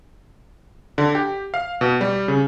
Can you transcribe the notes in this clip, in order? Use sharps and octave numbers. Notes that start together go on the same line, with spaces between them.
D3
G4
F5
B2
G3
C#3